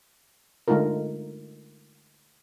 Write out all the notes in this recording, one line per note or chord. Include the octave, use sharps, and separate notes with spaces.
D3 G#3 A3 D#4 F4 A#4